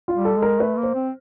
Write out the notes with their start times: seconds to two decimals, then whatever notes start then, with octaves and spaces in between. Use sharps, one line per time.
0.08 F4
0.14 G3
0.25 A4
0.37 G#3
0.42 A#4
0.60 A3 B4
0.77 A#3
0.83 C5
0.95 C4